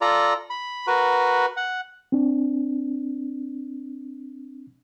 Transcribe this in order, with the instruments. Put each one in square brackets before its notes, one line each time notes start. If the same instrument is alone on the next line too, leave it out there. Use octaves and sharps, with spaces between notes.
[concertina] F4 A4 D5 A#5
B5
F#4 A#4 B4
F#5
[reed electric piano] C4 D4